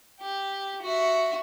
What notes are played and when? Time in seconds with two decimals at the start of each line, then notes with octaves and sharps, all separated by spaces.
0.20 G4
0.82 F#4 E5